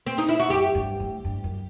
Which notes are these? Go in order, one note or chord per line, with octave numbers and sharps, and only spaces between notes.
C4
D#4
E4
F#4
F#2 G4
G2
A2
G2
F#2